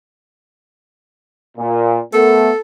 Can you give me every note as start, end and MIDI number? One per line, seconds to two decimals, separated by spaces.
1.57 2.00 46
2.13 2.50 57
2.13 2.50 59
2.13 2.59 69
2.13 2.50 70